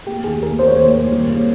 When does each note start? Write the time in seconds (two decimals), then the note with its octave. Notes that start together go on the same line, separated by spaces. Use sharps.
0.06 A#3 G4
0.24 D#2 G#4
0.43 D#2 A#4
0.59 A#3 C5
0.68 C#5
0.76 D#2 C5
0.95 D#2
1.12 G3
1.30 A#3